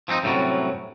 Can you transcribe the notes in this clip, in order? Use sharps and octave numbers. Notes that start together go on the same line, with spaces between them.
F3 C4 D4 D#4
F#2 A2 C3 D#3 F#3 G3